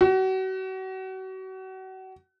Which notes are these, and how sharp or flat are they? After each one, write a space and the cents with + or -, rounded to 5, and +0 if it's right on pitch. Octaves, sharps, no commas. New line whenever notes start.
F#4 +35